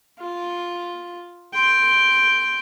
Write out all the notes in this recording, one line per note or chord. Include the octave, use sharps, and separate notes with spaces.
F4
G5 C6